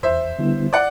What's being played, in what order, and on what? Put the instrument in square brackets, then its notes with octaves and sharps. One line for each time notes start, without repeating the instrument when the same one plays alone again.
[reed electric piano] E2 [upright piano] C5 E5
[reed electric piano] D3 G3 B3 E4
[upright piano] D5 F#5